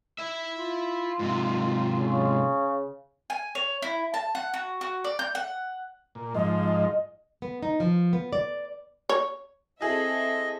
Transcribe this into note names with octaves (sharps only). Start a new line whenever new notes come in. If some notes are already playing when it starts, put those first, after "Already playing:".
E4 E5
F4
G#2 C3
C#3
G#5
C#5
E4
A5
F#5
F#4
F#4
D5
G6
F#5
A#2
G#2 F3 D#5
B3
D#4
F3
B3
D5
C#5
C4 E4 G#4 A4 D#5 E5